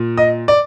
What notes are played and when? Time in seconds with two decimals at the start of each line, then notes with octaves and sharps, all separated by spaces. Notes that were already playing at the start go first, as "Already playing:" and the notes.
Already playing: A#2
0.17 D#5
0.48 D5